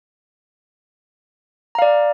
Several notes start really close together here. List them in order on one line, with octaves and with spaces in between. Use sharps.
A#5 F5 D5